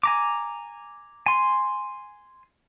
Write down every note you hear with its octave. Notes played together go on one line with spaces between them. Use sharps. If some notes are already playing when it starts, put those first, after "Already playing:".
G#5 A#5 D6
G#5 C6